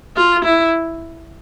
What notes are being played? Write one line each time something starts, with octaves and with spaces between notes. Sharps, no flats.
F4
E4